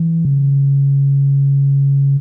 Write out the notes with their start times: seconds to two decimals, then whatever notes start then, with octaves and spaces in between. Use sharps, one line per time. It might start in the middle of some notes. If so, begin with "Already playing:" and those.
Already playing: E3
0.25 C#3